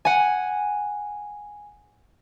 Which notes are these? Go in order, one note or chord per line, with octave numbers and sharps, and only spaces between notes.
F#5 G#5